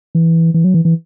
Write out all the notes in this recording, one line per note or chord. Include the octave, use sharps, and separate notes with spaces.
E3
E3
F#3
E3
E3